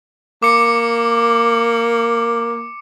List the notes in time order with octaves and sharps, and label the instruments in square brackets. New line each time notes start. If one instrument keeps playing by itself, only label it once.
[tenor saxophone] A#3 [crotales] D6 C#7